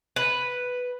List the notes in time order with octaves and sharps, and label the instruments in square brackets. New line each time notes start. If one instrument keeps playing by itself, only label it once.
[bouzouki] B4